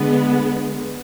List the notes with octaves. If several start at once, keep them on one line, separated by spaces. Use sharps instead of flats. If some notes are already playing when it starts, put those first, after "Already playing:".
Already playing: D3 G#3 B3